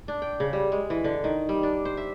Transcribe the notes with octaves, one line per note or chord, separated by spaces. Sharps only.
D4
G5
C#3
G3
G#3
E3
D3
D#3
G3
D4
C5
E5